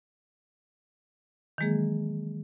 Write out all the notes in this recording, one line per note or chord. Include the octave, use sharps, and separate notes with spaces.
D#3 E3 F#3 G#3 A#3 G#4